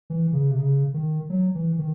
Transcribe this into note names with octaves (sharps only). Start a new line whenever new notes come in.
E3
C#3
C3
C#3
D#3
F#3
E3
D#3